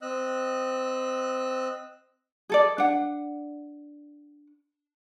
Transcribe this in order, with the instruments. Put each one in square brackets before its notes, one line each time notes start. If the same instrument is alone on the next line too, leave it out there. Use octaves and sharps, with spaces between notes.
[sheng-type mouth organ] C4 D#5 E6 F#6
[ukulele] G#4 A4 D5
D4 F#5